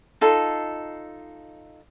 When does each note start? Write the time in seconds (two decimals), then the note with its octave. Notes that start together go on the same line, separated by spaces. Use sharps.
0.21 D#4 F4 A4